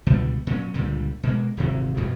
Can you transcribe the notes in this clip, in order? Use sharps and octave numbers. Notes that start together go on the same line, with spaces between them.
C#2 B2 D3 G3
A#2 F#3 C#4
C#2 A#2 D3 G3
B2 G#3 A#3
D#1 G#1 C3 E3
F#2 B2 F3 F#3